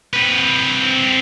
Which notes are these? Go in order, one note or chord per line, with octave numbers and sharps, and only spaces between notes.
C4 B4